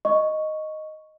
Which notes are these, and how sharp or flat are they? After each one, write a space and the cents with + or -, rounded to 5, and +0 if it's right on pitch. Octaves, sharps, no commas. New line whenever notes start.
D#5 +0 C#6 +0